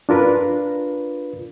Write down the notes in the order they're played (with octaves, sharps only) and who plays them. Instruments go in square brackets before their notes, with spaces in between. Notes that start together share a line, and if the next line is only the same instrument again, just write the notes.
[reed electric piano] D4 F4 A#4 B4